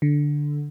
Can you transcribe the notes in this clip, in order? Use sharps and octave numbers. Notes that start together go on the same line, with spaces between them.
D3